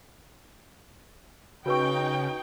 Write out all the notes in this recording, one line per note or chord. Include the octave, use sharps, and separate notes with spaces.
C#3 D#4 F#4 B4 G5 C#6